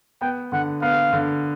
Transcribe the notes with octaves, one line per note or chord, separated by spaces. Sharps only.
B3 G5
D3 F#5
B3 F5
D3